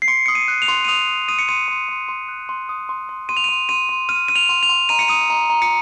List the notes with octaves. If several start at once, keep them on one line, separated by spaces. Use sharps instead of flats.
C7
C6 C#7
D#6 C#7
D#7
F#6
F7
C6
D#7
D#6 F7
D#6
D#6 D#7
C#7
C6 D#7
C6
C6
C6
F#6
C6
D#6
C6
C6
C6 D#7
F7
C6 D#7
C6 D#7
C6
F6 D#7
F6 D#7
F7
C6
F7
C6
A#5 D#7
C#7
D#6 D#7
A#5
A#5
C#7